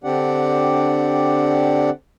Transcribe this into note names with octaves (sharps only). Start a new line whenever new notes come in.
D3 C4 D4 G4 D5 F#5